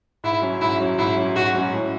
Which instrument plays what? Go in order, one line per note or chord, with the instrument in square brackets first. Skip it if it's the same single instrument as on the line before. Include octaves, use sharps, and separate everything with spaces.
[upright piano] G#2 [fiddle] E4
[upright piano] F#3 C#4
[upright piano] G#2 [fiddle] E4
[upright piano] F#3 C#4
[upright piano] G#2 [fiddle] E4
[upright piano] F#3 C#4
[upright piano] G#2 [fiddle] F#4
[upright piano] F#3 C#4
A2